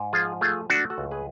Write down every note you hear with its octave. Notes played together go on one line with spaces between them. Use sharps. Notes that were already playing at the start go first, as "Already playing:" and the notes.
Already playing: G#2
F3 F4 G#4
A3 F4 G#4
A3 D4 F#4
F#4 A4
C#2
G#4 B4